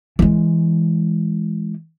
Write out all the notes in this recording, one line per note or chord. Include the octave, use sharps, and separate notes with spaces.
E3 G#3